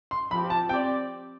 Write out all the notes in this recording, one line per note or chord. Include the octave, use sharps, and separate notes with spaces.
C6
F3 C4 G4 B5
A5
C4 G4 D5 G5